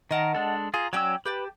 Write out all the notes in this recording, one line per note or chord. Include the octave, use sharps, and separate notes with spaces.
D#3 A#4 D#5 F#5 A5
G#3 D4 A4
F4 G#4 A#5
F#3 C#4 C#5 D5 G5 E6
G4 B4 G5 A5